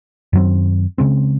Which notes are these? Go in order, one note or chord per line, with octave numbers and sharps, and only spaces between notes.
F#2 D#3 F#3 C4
C#3 G#3 C4